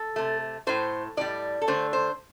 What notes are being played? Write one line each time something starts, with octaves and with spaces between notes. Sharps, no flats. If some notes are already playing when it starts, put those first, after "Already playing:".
Already playing: A4
C3 A3
A2 A3 C5
A2 G3 D5
A4
D3 A3 C5
C5